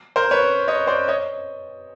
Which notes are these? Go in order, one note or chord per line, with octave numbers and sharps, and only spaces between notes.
A#4 C5
B4 C#5
C#5 D#5
C5 D5
C#5 D#5